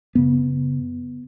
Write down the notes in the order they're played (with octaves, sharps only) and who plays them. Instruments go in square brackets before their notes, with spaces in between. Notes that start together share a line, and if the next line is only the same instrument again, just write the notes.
[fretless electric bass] F#2 C#3 B3